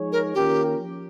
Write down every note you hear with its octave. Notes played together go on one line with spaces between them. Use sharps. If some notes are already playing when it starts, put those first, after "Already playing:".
Already playing: F3 G#3 D#4 G#4 C#5
A#4
D#3 A#3 C#4 F4 G4 A#4
F3